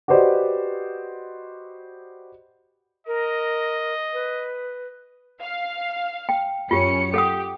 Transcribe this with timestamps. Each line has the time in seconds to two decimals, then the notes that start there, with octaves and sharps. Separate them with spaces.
0.08 F#4 G4 B4 C5 D5 D#5
3.07 A#4 D#5
4.13 B4
5.42 F5
6.29 G5
6.71 F#2 C#4 F4 G4 C#7
7.14 G4 A4 F#5 D#6